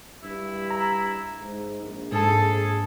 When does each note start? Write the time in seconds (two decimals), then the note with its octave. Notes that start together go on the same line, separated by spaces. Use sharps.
0.23 G2 E4
0.71 A#5
1.40 G#2
1.83 A#1
2.12 G#2 G#4 A4 A5